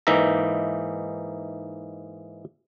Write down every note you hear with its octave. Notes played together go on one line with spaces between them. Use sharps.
G#2 E3 A#3 D#4 E5 A#5